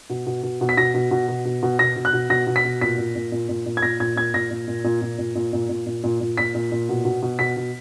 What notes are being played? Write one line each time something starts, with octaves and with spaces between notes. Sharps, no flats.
B2
B2
B2
B2
B6
B2 A#6
B2
B2
B2
B2
B2
B2 A#6
B2
F#6
B2
B2 A#6
B2
B6
B2
A#2 B6
A#2
A#2
A#2
A#2
A#2
G#6
A#2 A#6
A#2 G#6
A#2 G#6
A#2 A#6
A#2
A#2
A#2
A#2
A#2
A#2
A#2
A#2
A#2
A#2
A#2
A#2 B6
A#2
A#2
B2
B2
B2
B2 B6
B2